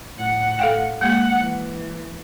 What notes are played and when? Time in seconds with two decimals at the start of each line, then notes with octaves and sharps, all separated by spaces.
0.16 A2 F#5
0.59 A4 F5 G5
1.01 G#3 A#3 F#5
1.39 E3